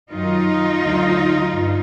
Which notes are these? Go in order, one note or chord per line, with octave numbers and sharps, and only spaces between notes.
F#2 D#3 F#3 D#4 F4
D2 D3 F#3
G2